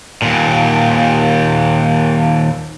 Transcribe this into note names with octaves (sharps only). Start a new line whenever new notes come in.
D#2 A#2